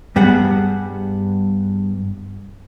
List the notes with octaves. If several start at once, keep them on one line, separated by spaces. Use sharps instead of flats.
G2 G3 B3 G#4 F#5